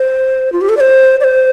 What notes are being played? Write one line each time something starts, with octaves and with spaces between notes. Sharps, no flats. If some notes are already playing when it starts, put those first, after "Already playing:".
Already playing: C5
F4
G4
A4
D5
C5
D5
C5